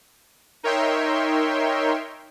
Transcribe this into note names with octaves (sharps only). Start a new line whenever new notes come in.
D#4 A#4 C#5 E5 G5 C6